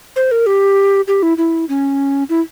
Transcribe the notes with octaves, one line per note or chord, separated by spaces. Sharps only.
C5
A#4
G4
G4
E4
E4
C#4
E4